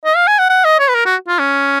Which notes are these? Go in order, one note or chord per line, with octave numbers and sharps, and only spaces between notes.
D#5
F5
G#5
F#5
F#5
D#5
C#5
B4
A#4
F#4
F4
C#4